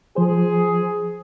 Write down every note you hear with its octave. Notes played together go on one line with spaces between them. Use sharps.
F3 G#4 C5